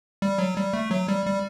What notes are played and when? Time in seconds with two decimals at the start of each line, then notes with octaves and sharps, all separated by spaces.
0.22 G3
0.38 F#3
0.57 G3
0.74 A3
0.91 F#3
1.08 G3
1.26 G3